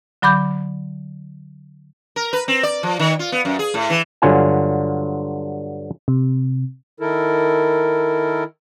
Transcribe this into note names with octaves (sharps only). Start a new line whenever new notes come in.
D3 F#3 B5 D6 G6
A#4
B4
C4
D5
F3
D#3
F4
B3
F#2
G#4
A2
E3
G2 D3 F#3 F4 G#5
C3
D#3 E4 A4 A#4